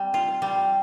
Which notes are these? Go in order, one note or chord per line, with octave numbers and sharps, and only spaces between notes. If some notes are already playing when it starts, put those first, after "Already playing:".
Already playing: G3 C4
F4
G3